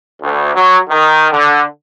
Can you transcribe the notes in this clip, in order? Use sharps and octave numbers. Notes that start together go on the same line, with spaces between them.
D2
F#3
D#3
D3